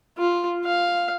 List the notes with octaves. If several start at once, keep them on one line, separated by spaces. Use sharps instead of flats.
F4
F5